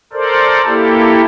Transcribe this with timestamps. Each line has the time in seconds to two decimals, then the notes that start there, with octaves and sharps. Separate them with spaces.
0.13 A4 A#4 C5 D5
0.66 A#3 E4 G4 A4